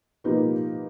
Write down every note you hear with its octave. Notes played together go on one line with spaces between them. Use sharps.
F3 A#3 D#4 G4 B4